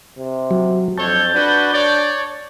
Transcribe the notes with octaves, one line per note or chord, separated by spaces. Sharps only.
C3
F#3
F2 D4 A4 C#5 A5 G6
D4 F#4 B4
C#5 D5